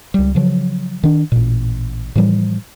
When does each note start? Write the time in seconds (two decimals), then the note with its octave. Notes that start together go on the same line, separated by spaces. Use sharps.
0.14 C#2 G3
0.35 C#3 F3 F#3
1.04 D#3 D4
1.32 A1 A#2
2.16 A2 E3 F3 G3